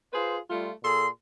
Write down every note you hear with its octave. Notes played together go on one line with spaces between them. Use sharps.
F4 G#4 B4 C5
G3 A3 F4
A#2 G#4 A4 C6